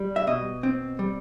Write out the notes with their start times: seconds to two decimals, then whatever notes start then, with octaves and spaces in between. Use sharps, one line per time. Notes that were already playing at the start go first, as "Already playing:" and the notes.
Already playing: G3
0.16 E5
0.27 B2 D#5
0.63 C4
0.99 G3